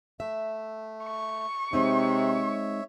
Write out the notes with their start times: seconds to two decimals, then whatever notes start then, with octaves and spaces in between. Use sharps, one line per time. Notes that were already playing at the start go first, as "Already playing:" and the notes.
0.20 A3 E5
1.05 C#6
1.73 C3 G#3 C4 D#4 C#5 E5